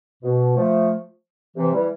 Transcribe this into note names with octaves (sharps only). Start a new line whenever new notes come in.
B2
F3 A3
C3 E3
E3 G3